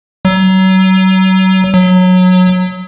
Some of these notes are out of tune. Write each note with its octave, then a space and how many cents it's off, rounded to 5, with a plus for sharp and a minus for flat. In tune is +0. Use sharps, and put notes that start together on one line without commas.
F#3 +30
F#3 -15